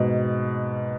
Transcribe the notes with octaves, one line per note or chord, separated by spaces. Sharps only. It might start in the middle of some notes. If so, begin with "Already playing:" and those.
Already playing: G#2 B2